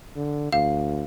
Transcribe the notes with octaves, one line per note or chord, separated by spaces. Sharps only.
D3
D2 F5